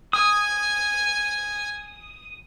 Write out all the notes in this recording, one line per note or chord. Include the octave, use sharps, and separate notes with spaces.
G#5 D#6